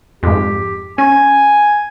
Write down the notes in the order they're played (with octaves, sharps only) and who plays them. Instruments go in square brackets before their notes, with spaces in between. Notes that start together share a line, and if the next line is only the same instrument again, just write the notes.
[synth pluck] F2 G#2 [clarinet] G4
[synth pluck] C#4 [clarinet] G#5